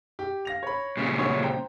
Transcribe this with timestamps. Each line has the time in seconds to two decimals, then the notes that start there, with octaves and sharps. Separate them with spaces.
0.19 G4
0.45 F5 A#6 F7
0.63 C#5 B5
0.97 A#2 C#3 G3
1.19 C#4 F#4 C#5
1.42 C5 G5 A#5